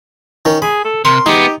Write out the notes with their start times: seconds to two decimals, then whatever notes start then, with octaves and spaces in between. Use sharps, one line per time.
0.45 D#3 C#4
0.62 G#4 B5
0.85 A4
1.05 C3 A#4 C6
1.26 G#3 B3 D#4 G4